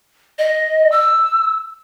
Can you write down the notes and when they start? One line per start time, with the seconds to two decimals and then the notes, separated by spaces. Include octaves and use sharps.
0.38 D#5
0.92 E6